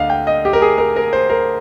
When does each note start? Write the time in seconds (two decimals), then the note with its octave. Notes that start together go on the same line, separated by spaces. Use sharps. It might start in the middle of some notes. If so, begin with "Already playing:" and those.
Already playing: D2 D4 D5 D#5 F5
0.10 G5
0.27 D#5
0.45 G4
0.53 A#4
0.62 G#4
0.78 A#4
0.96 A#4
1.13 C5
1.30 A#4